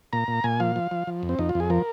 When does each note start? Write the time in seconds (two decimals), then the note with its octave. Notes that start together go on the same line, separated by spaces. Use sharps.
0.13 A#2 A#5
0.28 A#2
0.44 A#2 G#5
0.60 F3 F5
0.76 F3
0.91 F3
1.07 F3
1.23 F2
1.29 C4
1.39 F2 D#4
1.49 F4
1.55 F2
1.60 G#4
1.70 F3 A#4